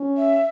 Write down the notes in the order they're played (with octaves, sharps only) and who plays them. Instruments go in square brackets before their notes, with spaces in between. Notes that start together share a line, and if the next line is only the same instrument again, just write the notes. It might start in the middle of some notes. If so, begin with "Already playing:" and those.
Already playing: [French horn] C#4
[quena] E5